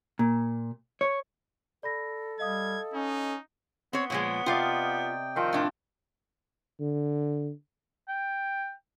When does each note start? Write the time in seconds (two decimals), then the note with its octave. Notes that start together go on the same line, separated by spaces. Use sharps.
0.19 A#2
1.01 C#5
1.83 A4 D5 B5 A#6
2.40 G3 D#5 F5 D#6 G#6
2.94 C#4 D#4
3.93 B3 C4 C#5
4.10 A#2 F3 G#3 C#5
4.46 C3 F4 D5 D#5 F5 G5
5.36 D#3 F3 C4
5.53 A2 D4
6.80 D3
8.08 G5